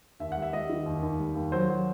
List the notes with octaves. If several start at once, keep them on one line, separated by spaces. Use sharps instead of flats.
D#2 E5
G3 F#5
E5
G3 D#5
D#3
D#2
D#2
G3
D#2
F#3 C5
F#3